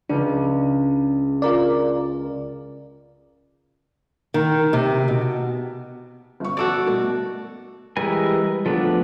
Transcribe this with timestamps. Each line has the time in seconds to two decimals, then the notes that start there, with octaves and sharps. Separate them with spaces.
0.09 C#2 D4
1.42 F4 A#4 D5
4.34 D#3
4.73 C3
5.08 B2
6.40 G1 C#6
6.57 F#4 A4 D5
6.86 B2 A3
7.97 E3 G3 G#3 A#4 G#5
8.66 F3 A3 B3 D4